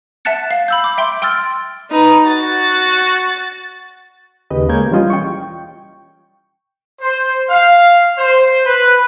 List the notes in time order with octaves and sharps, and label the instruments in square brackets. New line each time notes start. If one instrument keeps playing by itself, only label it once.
[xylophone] E5 F#5 A5 F#6 A6 C#7
F5
B5 E6 G6
D6 G6
E5 G5 C6
G5 C6 E6 F6 A6
[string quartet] D#4 B4 A#5
[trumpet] F#4 [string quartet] A6
[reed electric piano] D#2 C#3 G4 B4 D#5
G#3 A#3 A#4 C#5 G6 G#6
E3 G3 C#4 F4 D#5
G5 C#6
[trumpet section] C5
F5
C5
B4